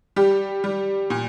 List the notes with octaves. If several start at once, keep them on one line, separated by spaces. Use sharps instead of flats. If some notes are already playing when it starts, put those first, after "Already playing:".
G3 G4
G3
A#2